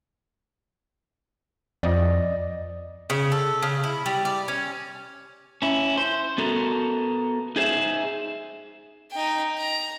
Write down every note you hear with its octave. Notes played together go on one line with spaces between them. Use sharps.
F2 D5 D#5
C#3
A4
C#3
E4
G3
D5
C#4
C#4 E4
C5
B3 F#4 A4 A#4
D#4 G#4 C5 E5
D#4 G5
A#5